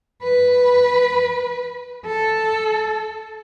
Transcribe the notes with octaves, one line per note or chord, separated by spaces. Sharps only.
B4
A4